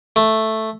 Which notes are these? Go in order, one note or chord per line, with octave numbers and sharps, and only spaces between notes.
A3